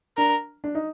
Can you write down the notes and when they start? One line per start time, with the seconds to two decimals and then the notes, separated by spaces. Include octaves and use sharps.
0.17 D4 A#4
0.64 D4
0.75 D#4